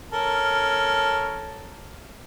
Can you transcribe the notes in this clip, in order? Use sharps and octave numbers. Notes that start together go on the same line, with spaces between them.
C#4 A4 A#4